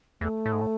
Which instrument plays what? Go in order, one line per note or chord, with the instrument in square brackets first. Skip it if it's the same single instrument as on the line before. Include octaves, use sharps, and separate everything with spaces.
[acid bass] E2 [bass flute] A3
[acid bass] A2
G#2
A2